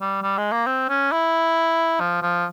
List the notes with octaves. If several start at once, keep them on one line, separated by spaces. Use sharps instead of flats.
G3
G3
G#3
A#3
C4
C#4
E4
F3
F3